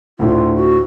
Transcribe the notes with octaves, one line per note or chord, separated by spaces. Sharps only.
D2 A2 D3 F4
F#4